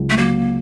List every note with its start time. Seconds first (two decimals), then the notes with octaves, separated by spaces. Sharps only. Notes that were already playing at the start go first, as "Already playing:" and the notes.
Already playing: C#2 F#3
0.10 A3
0.17 F#3 A#3